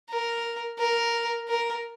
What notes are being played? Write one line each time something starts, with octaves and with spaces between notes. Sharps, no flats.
A#4
A#4
A#4